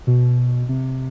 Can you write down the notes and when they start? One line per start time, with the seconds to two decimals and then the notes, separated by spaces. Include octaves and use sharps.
0.07 B2
0.69 C3